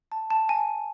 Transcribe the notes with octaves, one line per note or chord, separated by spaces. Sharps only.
A5
A5
G#5